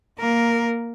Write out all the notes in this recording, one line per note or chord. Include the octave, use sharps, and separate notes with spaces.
A#3 A#4